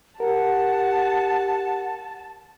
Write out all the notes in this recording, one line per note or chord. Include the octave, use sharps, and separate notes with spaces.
G4 A#4 F#5 A5